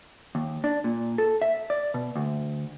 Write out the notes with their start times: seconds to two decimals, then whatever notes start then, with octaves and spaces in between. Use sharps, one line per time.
0.35 D#2
0.64 D4
0.84 A#2
1.18 A4
1.42 E5
1.70 D5
1.94 B2
2.16 D2